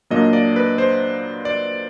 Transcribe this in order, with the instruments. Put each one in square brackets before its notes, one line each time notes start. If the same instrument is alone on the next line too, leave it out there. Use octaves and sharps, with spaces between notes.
[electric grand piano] A#2 F#3 A#3 D4 D#5
D5
B4
C5
D5